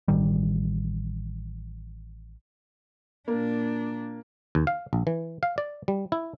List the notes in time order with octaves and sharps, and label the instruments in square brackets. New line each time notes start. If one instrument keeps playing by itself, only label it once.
[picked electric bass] A1 D#3 G3
[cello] A#2 D4 [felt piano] A#3
[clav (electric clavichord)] D#2
F5
A#1
E3
F5
D5
G3
E4